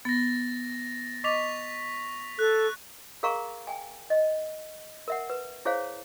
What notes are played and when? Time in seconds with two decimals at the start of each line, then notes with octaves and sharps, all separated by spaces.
0.05 B3 A6 A#6
1.24 D#5 C#6 D6 A6 B6 F7
2.39 A4 F#6
3.23 G#4 A#4 F5 A#5 C#6
3.67 G5 G#5
4.10 D#5
5.08 A#4 E5 F#5
5.30 B4
5.65 E4 G#4 C5 C#5 F5